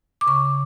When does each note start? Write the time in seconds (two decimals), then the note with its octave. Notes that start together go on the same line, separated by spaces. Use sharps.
0.21 D6
0.27 C#3 C#6